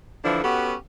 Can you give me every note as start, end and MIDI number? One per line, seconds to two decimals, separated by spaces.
0.24 0.42 50
0.24 0.42 52
0.24 0.42 53
0.24 0.42 62
0.24 0.42 64
0.44 0.75 59
0.44 0.75 61
0.44 0.75 66
0.44 0.75 67
0.44 0.75 69